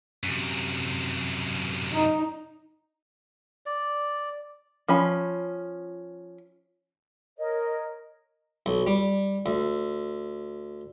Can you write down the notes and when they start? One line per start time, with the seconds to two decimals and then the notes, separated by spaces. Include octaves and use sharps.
0.24 F#2 C3
1.93 D#4
3.66 D5
4.88 F3 C#4 B5
7.37 A#4 C#5 D#5
8.66 B1
8.87 G3
9.46 D2